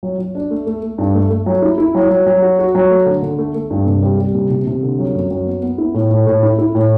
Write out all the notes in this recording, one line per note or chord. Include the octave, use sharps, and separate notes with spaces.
F#3
F#3
D4
A3
A3
A3
G2
A3
A3
F#3
E4
E4
F#3
F#3
F#3
F#4
F#4
F#3
A3
D3
D3
A3
A3
G2
C3
G3
G3
C3
C3
C3
D3
F#3
F#2
F#3
B3
B3
E4
A2
A2
A2
E4
E4
A2